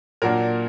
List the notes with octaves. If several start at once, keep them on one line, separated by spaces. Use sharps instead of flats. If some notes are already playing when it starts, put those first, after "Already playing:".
A#2 F#3 A#3 D4 A#4